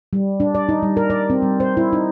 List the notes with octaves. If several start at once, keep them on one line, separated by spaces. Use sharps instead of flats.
G3
D4
D5
D#4
G3
A#4
D5
C4
G3
C5
E4
D#4